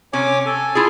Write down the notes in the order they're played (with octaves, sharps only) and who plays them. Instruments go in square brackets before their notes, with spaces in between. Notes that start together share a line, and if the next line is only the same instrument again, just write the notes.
[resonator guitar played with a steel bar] C3 C#4 [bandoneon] C#5 G#5 D6
[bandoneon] A4 G#5
[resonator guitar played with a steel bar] E4 F4 G#4